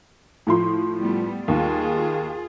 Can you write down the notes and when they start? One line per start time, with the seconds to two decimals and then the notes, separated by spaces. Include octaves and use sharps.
0.47 A2 F3 C6
1.01 G3 A3 B3
1.48 D#2 F4 G#4